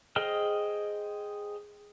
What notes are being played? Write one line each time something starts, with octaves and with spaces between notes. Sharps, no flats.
G#4 C5 D#5 G5 F6